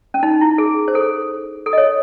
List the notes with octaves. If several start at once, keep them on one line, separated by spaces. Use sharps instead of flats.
C#4
D#4
E4
G#4
C5
A4
A4
D#5
C#5